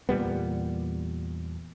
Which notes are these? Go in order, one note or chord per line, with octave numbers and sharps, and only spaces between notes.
E2 A#2 G3 B3